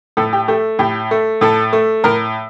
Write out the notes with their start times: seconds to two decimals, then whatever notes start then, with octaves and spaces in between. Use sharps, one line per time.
0.17 A2 A4
0.33 G4
0.48 A3 G4
0.79 A2 G4
1.11 A3
1.41 A2 A4
1.73 A3
2.04 A2 A#4